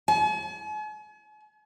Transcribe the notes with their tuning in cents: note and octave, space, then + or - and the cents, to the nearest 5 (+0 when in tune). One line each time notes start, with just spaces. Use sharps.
G#5 +45